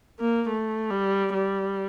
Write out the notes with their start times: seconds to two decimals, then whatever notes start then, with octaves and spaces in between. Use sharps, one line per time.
0.20 A#3
0.49 A3
0.90 G3
1.33 G3